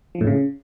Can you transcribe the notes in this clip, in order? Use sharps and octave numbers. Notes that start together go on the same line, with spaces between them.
F3
A2
C#3